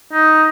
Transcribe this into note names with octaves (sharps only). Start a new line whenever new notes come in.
D#4